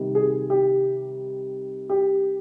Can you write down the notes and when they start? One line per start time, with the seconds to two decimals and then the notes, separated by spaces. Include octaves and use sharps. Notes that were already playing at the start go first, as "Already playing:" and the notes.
Already playing: C3 D#3 G3
0.15 G#4
0.50 G4
1.89 G4